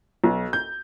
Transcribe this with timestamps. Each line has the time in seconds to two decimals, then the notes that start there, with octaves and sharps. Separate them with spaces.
0.24 B1
0.53 G6